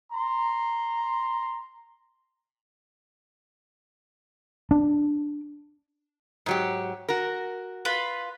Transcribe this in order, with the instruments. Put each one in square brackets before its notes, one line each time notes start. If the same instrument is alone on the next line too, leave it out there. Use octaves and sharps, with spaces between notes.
[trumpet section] A#5 C6
[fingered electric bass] D4
[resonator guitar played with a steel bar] G#2 F#3 G4
F#4 A#4
[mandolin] F4 B4 B5